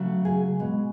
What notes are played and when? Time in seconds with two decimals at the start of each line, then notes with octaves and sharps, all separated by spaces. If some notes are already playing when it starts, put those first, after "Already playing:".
Already playing: C#3 F#3 A3
0.25 G#4
0.59 B2 G#3